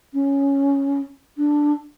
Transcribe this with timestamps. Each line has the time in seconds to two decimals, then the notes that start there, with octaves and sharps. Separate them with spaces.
0.13 C#4
1.37 D4